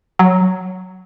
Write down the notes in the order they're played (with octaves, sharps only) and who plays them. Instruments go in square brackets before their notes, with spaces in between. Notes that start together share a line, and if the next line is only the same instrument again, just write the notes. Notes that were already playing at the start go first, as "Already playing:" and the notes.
[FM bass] F#3